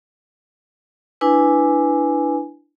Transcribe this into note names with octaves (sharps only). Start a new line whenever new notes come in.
D4 E4 B4 G#5